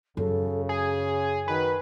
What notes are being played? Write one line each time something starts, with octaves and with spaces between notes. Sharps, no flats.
F#2 C#3 A4
G#4 G#5
D#3 F#4 B4